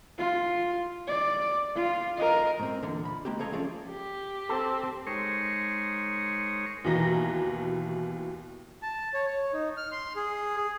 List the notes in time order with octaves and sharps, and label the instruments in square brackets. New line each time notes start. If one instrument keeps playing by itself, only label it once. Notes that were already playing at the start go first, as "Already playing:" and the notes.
[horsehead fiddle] F4
D5
F4
A#4 D#5
[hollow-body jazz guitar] G#2 C4
E2 A#2 D3
B5
G#3 A#3 C4 G4
C#3 C4 A4 C#5 D#5 A#5
F3 C#4 G#4 A4 D5
[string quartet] G4
[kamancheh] C4 [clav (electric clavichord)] A4
[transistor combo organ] G#3 D#4 A#4 C5 C#5 C#6
[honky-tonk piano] D#2 B2 E3 A#5 A#6
[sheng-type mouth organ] A5
C#5
C#5
D#4
F6
C6
G#4
G#4